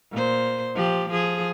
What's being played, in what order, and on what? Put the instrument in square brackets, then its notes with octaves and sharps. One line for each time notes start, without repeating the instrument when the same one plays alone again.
[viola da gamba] A#2 C5
F3 G4
F3 G#4